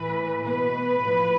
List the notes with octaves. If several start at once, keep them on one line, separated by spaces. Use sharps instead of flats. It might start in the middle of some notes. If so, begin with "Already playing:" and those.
Already playing: A2 E3 B4
B2 B4
A2 F3